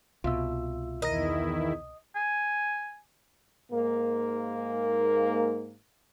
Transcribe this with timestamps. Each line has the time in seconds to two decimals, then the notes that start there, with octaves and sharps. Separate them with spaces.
0.24 C2 B2 F4 E5 E6
1.02 E2 D#3 E4 A#4 D#5 A#5 A#6
2.15 G#5
3.72 G#2 A#3